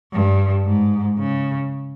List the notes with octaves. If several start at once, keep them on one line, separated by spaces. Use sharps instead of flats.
G2
G#2
C#3